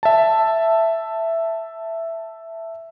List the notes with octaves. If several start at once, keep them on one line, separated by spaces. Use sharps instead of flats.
E5 A5